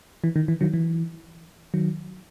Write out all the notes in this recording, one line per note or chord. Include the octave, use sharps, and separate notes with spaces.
E3
D#3
E3
D#3 F#3
E3
D#3 F#3